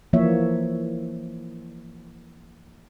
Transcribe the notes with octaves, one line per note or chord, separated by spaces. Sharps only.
E3 F3 A#3 C#5 E5